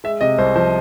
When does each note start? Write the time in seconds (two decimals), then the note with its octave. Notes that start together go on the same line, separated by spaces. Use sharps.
0.04 G#3 E5
0.21 C3 D#5
0.38 C2 C5
0.56 F3 C5